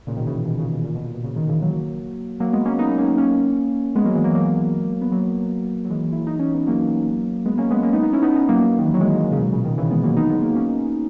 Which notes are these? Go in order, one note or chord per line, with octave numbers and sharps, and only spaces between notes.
A#2 C#3
B2 D#3
C#3 E3
B2 D#3
A#2 C#3
B2
A#2
B2
A#2
B2
A#2 C#3
B2 D#3
C#3 E3
F#3 A#3
F#3 A#3
G#3 B3
A#3 C#4
B3 D#4
A#3 C#4
A#3 C#4
G#3 B3
F#3 A#3
E3 G#3
F#3 A#3
F#3 A#3
B3
F#3 A#3
F#3
E3 G#3
E4
D#4
C#4
B3
F#3 A#3
G#3 B3
A#3 C#4
G#3 B3
A#3 C#4
B3 D#4
B3 D#4
C#4 E4
B3 D#4
B3 D#4
F#3 A#3
D#3
E3
F#3
E3 G#3
C#3
B2
A#2 C#3
B2 D#3
C#3 E3
G#3 B3
F#3 A#3
B3 D#4
G#3 B3
F#3 A#3
A#3 C#4